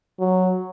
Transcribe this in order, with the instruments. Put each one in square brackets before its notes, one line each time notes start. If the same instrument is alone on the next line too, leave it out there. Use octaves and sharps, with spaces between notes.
[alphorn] F#3